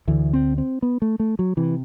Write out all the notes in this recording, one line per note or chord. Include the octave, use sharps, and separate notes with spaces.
D2 D3 E3
C4
C4
B3
A3
A3
F#3
C3 E3